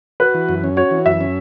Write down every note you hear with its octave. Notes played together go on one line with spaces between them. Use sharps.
F#4 B4
E3
F#2
C#4
F#4 C#5
E3
F#2 E5
C#4